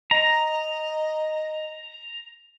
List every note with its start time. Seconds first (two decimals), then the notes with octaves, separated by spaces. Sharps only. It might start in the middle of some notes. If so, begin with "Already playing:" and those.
0.11 D#5 A#5